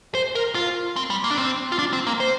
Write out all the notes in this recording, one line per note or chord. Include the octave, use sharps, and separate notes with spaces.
C5
A#4
F4
C4
G3
A#3
D4
C4
F4
D4
C4
A#3
C5